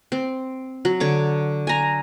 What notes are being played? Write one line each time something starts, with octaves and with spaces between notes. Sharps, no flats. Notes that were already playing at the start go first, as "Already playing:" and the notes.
C4
F#3
D3 C#5 D6
G#5 A#5